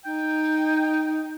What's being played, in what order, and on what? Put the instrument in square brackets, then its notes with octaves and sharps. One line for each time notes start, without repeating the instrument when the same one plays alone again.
[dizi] D#4 [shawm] G5